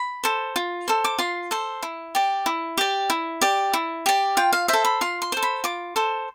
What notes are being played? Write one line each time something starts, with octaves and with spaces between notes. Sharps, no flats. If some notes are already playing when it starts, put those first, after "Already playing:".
Already playing: B5
A4 C5
F4
A4 C5
D6
F4 C6
A4 C5
E4
G4 D5
E4
G4 D5
E4
G4 D5
E4
G4 D5
F4 G5
F5
A4 C5 E5
B5
F4 C6
C6
A4 C5
B5
F4 D6
A4 C5